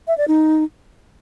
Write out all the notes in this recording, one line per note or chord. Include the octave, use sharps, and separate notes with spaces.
E5
D5
D#4